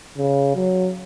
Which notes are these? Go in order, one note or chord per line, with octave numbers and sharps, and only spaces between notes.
C#3
F#3